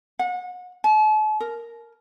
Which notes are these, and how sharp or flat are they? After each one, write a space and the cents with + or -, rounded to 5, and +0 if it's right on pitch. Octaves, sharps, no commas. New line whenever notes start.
F#5 -35
A5 -40
A#4 -5